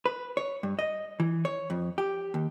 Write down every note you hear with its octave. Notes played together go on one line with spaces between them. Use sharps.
B4
C#5
G2
D#5
E3
C#5
F2
G4
D#2